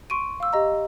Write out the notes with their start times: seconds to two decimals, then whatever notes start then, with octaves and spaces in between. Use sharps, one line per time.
0.10 C6 C#6 D7 D#7
0.40 F5 E6
0.53 G4 D#5 A#5